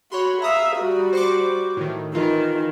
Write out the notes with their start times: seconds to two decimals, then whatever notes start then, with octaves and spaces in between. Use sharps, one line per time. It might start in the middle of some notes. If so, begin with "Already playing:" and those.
0.12 F#4 C#5 B5 C6
0.42 E5 F5 A#5 D#6
0.77 G3 F#4
1.13 C5 C#6 D6
1.77 A2 D#3
2.14 D#3 E3 F4